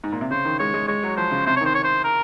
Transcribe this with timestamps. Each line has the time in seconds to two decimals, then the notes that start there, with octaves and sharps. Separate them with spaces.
0.04 G#2
0.12 A#2
0.21 C3
0.31 C#3 C5
0.45 D#3
0.59 G#3 C#5
0.74 G#3
0.88 G#3 C#5
1.03 F#3
1.17 F3 C5
1.32 C#3
1.46 C3 C5
1.56 C#5
1.61 D#3 C5
1.75 C#5
1.84 C5
2.04 A#4